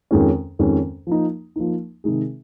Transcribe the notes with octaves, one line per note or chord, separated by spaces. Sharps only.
F2 D#3 G#3 C#4
F2 D#3 G#3 C#4
F3 A#3 D#4
F3 A#3 D#4
C3 D#3 G#3 D#4 G#4